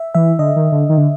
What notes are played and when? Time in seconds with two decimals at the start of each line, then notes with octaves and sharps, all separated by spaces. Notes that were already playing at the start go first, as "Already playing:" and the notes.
Already playing: E5
0.15 E3 E5
0.39 D3 D#5
0.56 D#3
0.72 D3
0.89 D#3
0.97 D3